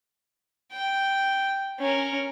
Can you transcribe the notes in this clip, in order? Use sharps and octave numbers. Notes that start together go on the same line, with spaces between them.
G5
C#4 A#4